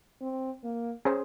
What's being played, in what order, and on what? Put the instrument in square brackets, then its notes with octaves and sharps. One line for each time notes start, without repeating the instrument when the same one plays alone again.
[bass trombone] C4
A#3
[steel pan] C#4 G#4 C5